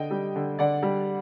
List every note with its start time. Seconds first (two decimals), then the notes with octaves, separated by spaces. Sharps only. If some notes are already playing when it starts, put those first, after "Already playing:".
Already playing: D3 D#5 G5
0.11 G3
0.36 D3
0.59 D3 D5 F#5
0.83 G3